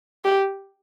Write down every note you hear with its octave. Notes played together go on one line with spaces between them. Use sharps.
G4